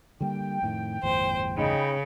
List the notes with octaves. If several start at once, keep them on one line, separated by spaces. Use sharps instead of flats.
D3 G3 A#3 G5
F2 A2 D#3
G1 E2 A2 C5
C#3 D#4 G5 B5